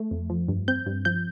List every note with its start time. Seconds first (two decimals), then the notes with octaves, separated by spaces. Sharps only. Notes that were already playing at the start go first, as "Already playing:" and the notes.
Already playing: A3
0.11 F2
0.30 F3
0.48 G2
0.68 C4 G6
0.86 G2
1.05 F3 G6